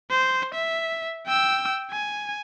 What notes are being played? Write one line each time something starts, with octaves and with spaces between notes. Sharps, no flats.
C5
E5
G5 E6
G#5